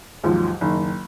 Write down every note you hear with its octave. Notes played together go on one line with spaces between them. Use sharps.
D#2 G#2 F3 F#3
F#1 D#3